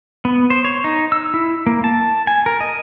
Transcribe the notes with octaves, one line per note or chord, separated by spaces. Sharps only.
B3
C5
C#5
D#4
E6
E4
A#3
A5
G#5
A#4
D#5